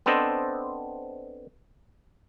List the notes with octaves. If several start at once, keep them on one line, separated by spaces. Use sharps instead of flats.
B3 C4 D4 A4 C5 D#5